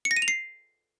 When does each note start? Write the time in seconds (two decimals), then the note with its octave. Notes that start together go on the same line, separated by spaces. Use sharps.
0.05 C#7
0.11 A#6
0.17 D#7
0.22 F7
0.28 C7